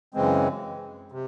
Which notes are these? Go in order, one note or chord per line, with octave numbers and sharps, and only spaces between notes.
F#2 C#3 E3 G#3 C4
C3